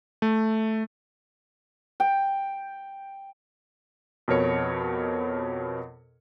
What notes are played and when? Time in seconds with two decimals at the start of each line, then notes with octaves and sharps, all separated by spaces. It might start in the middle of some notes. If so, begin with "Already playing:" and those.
0.22 A3
2.00 G5
4.28 F2 B2 A#4 C#5 C#7